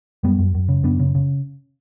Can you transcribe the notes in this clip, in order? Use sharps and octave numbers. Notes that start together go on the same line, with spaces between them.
F#2 G3 B3
F#2
F#2
C#3
F#2 B3 D4
C#3
C#3